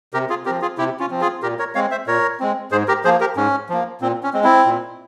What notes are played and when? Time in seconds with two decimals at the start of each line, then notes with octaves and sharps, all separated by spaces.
0.14 C3 G4 A#4
0.30 F4 G#4
0.46 C4 G4 A#4
0.50 F3
0.62 F4 G#4
0.78 C3 E4 G4
1.00 C#4 F4
1.11 F3 C4
1.21 F4 G#4
1.43 A#2 G4 A#4
1.59 A#4 C#5
1.75 G#3 C4 C#5 F5
1.91 C5 E5
2.07 A#2 A#4 C#5
2.40 G#3 C4
2.72 G#2 G#4 C5
2.88 G4 A#4
3.04 F3 A#3 G#4 C5
3.20 G4 A#4
3.36 G#2 C#4
3.69 F3 A#3
4.01 A#2 C4
4.23 C#4
4.33 G#3 C4
4.44 C4 E4
4.66 A#2